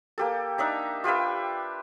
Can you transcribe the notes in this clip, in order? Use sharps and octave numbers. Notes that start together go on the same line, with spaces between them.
A#3 G4 A4
D4 D#4 E5 A#5
F4 G4 B4 E5